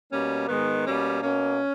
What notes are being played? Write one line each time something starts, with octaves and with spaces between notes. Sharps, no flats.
B2 G3 A#3 C#4
G#2 D#3 G#3 B3
B2 G3 A#3 C#4
B2 A#3 C#4